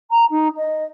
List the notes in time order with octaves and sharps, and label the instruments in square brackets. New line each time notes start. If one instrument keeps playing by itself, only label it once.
[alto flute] A#5
D#4
D#5